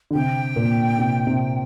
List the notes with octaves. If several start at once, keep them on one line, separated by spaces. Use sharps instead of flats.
D3
C3 G5
A#2
C3
C3